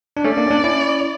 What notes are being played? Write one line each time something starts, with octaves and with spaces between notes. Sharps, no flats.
D4
A3 C#4 D5
A#3 D4
C#4
A#3 D4
C#4 E4